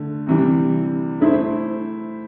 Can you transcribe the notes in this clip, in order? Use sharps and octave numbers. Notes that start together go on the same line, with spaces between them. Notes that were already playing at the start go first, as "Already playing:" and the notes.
Already playing: D3 A3
C3 E3 G3
A3 E4 C5